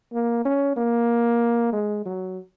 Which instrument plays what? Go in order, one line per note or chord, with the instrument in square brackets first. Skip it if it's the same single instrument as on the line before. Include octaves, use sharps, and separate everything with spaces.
[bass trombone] A#3
C#4
A#3
G#3
F#3